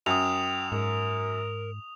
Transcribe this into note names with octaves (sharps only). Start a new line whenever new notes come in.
F#2 G5 D#6 F7
G#2 A#4